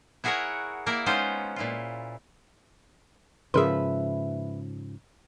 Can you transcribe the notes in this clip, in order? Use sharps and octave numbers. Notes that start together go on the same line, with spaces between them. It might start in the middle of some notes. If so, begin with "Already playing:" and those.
E4 F#4 G#4 A#4 C#5 F#5
A#3 E4 A#4 D5
G#3 B3 C#4 D#4 F4 C5
A#2 E4 F4
G#2 C#3 F3 G#4 A#4 B4 E5 C6